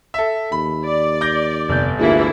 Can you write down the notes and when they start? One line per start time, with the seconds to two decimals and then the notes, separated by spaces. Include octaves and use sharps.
0.14 A4 E5
0.52 D#2 B5
0.86 D5
1.21 D6 G6 A#6
1.69 G1 F2 C3 G6
1.99 D2 E3 A#3 E4 F4 G#4